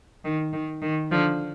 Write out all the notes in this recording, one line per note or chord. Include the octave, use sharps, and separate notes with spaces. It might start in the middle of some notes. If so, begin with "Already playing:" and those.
D#3
D#3
D#3
D3 F3